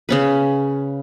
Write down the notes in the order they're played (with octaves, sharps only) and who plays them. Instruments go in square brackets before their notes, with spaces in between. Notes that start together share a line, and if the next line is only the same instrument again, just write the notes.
[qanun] C#3 C#4 B4